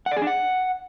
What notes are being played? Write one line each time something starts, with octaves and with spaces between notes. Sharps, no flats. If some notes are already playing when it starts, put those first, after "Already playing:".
F#5
D5
G#4
D4
F#5